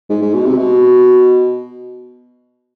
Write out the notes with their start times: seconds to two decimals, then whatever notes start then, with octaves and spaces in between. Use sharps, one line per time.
0.09 G#2
0.22 G#2
0.34 B2
0.46 C3
0.58 B2